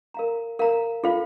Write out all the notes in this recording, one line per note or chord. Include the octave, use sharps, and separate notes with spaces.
A#4 F5 A#5
A#4 F5 A#5
F4 A4 C5 F5